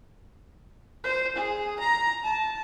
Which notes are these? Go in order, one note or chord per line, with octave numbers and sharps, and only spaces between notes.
C5
G#4
A#5
A5